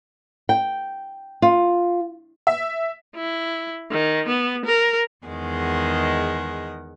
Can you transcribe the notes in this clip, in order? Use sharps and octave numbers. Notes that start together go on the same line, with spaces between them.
G5
F4
E5
E4
D#3
B3
A#4
E2 D#3 G#3 F#5